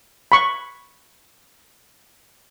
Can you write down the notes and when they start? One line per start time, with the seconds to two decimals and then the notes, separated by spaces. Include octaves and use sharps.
0.32 B5 C#6